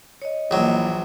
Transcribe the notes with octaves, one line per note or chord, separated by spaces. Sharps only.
C#5 D#5
A#1 E3 F#3 A#3